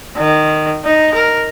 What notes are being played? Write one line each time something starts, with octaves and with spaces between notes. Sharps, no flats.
D#3
D#4
A#4